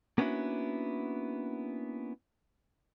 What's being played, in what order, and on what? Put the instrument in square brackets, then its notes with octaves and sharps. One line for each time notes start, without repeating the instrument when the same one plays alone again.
[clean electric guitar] A#3 B3 C#4 D4 E4 F#4